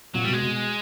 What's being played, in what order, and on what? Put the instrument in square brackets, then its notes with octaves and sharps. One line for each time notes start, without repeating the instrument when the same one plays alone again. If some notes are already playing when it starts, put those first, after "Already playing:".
[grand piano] A#2 [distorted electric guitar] F#3
[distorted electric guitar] G3
[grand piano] B2 [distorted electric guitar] G#3
[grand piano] B2